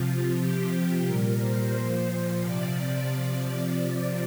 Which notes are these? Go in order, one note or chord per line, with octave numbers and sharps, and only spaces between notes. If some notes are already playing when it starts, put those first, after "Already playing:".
Already playing: C3 F3 F4
C3 F3 G4
A#2 G3 A#4
C5
A#2 F3 C5
C3 F3 D5